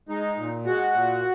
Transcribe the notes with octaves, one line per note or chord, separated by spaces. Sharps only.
G#3 D#4
A#2
G#3 F#4
A#2